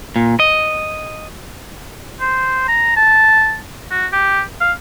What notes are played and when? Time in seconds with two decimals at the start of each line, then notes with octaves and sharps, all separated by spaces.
0.16 A#2
0.40 D#5
2.21 C5
2.68 A#5
2.96 A5
3.91 F#4
4.13 G4
4.61 F5